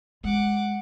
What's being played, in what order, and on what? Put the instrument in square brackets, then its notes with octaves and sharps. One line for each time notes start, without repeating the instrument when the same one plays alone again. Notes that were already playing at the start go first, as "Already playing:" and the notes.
[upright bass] G#3 [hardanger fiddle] F#5 D6